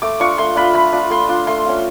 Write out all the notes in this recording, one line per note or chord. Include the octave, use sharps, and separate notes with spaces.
A3 D6
D4 F4 C#6
A3 C6
D4 F4 B5
A3 B5
D4 F4
A3 C6
D4 F4
A3 C6
C#4 F4